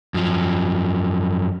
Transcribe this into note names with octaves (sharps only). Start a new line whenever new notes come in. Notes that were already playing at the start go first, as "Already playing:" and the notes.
F#2 F3